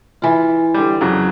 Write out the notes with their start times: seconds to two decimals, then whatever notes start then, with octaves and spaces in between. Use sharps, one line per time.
0.22 E3 F4
0.74 D3 G3
1.01 F2 C#3 F#3